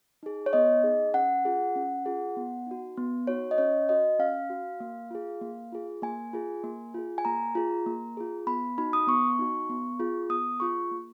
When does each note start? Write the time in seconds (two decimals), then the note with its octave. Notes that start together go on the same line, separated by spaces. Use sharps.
0.23 D#4 G#4
0.46 C#5
0.53 B3 D#5
0.83 D#4 G#4
1.14 C#4 F#5
1.45 F4 G#4
1.76 C#4
2.06 F4 G#4
2.37 B3
2.67 D#4 F#4
2.97 B3
3.27 D#4 F#4 C#5
3.51 D#5
3.58 C#4 C#5
3.89 F#4 D#5
4.19 C#4 F5
4.50 F#4
4.80 A#3
5.10 F4 G#4
5.41 A#3
5.72 F4 G#4
6.02 A#3 G#5
6.33 F4 G#4
6.64 A#3
6.94 F4 G#4
7.18 G#5
7.25 A#3 A#5
7.55 F4 G#4
7.86 A#3
8.17 F4 G#4
8.47 B3 B5
8.78 D#4 F#4 B5
8.93 D#6
9.07 B3 C#6
9.39 D#4 F#4
9.70 B3
10.00 F4 G#4
10.30 B3 D#6
10.60 F4 G#4 C#6
10.91 A#3